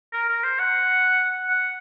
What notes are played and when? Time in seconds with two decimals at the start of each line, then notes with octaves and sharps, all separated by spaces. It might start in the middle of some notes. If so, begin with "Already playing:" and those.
0.13 A#4
0.29 A#4
0.44 C5
0.59 F#5
1.49 F#5